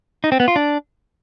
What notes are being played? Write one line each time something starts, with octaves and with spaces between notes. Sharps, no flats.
D#4
C4
B3
F4
D4